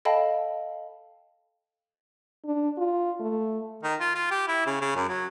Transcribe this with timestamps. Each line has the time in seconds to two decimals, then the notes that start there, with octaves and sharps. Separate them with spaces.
0.05 A4 D#5 F5 G5 A5 B5
2.45 D4
2.78 F4
3.20 A3
3.83 D#3
4.00 F4
4.15 F4
4.31 G4
4.48 E4
4.66 C#3
4.81 C#3
4.96 F#2
5.09 F#3